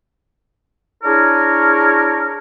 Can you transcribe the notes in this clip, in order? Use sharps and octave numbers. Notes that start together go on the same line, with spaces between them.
D4 E4 G#4 A#4 C#5